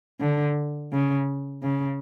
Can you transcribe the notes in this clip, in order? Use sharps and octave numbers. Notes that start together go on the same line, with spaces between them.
D3
C#3
C#3